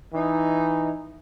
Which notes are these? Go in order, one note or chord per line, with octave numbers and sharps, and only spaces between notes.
E3 D#4